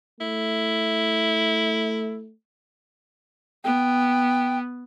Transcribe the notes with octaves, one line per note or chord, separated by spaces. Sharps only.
A3 E4
B3 G5